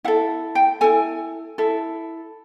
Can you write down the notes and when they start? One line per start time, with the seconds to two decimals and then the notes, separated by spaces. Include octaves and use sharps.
0.04 E4 F#5
0.08 A4
0.55 G5
0.81 E4 A4 G#5
1.58 E4 A4